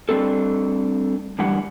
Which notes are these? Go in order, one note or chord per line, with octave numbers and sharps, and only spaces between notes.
G3 A3 C4 D4 A4
E2 A2 D3 G3 F#5